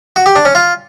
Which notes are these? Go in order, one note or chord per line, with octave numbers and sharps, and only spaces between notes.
F#4
G4
D4
C#4
F4